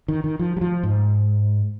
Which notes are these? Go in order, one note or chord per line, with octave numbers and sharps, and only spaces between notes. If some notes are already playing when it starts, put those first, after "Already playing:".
D#3
D#3
F3
F#3
F3
G#2